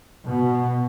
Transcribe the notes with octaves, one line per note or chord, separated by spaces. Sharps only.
B2